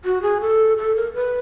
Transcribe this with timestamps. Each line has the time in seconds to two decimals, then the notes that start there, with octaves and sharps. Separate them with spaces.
0.05 F#4
0.22 G#4
0.41 A4
0.77 A4
0.96 A#4
1.14 B4